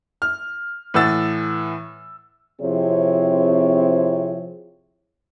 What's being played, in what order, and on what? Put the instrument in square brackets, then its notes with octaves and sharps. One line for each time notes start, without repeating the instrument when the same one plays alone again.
[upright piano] F6
A2 E3 F#5 E6 A6
[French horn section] C3 F3 C4 E4 G#4 C#5